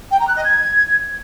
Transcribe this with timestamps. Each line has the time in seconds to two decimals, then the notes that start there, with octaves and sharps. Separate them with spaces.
0.10 G5
0.19 A#5
0.27 F#6
0.35 D#5
0.44 G#6